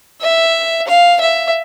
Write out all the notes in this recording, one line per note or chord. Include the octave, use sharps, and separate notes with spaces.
E5
F5
E5